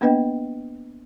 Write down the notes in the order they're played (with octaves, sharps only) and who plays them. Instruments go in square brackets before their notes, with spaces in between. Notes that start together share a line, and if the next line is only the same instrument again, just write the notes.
[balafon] A#3 B3 D4 B4 D#5 G5